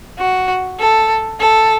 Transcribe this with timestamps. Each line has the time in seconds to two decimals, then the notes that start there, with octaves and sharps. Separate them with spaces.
0.18 F#4
0.80 A4
1.40 A4